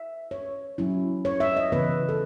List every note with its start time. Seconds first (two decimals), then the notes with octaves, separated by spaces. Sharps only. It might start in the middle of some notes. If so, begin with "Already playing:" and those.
Already playing: E5
0.31 C#5
0.78 F#3 C#4 E4
1.25 C#5
1.40 E5
1.57 D#5
1.72 C#3 E3 B3 B4
2.09 A4